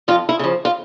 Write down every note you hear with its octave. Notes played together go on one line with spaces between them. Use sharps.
F2 F4
E4
C#3 F3
F4